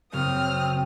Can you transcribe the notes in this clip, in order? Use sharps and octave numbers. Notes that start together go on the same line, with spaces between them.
F#1 C4 D#6 F6